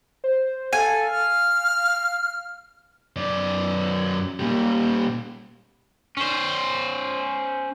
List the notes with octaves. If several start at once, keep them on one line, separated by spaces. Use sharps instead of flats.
C5
A4 F5 G#5
F6
F#2 D5
A#2 G3
C#4 C5